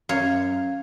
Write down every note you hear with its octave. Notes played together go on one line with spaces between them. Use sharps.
F#2 C#5 F5